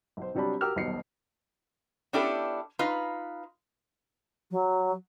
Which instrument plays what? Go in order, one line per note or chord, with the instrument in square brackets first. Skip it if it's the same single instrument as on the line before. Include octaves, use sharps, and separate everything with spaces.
[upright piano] B1 C5
C3 F#3 G3 D4 A5 B5
F#4 G4 A#4 D6 E6 F6
D#1 B1 B2 C7 C#7
[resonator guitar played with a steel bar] B3 C#4 D4 E4 G4 A4
D#4 F4 B4
[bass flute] F#3